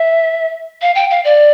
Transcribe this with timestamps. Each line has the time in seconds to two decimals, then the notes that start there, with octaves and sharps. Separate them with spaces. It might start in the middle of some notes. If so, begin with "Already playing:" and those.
Already playing: E5
0.82 F5
0.95 G5
1.11 F5
1.25 D5